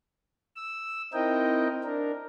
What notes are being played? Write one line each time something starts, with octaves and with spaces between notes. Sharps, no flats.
E6
C4 D#4 E4 A#4 D#5 G5
D4 A#4